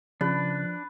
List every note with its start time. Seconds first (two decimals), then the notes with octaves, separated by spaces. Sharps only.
0.21 C#3 F3 D4 B4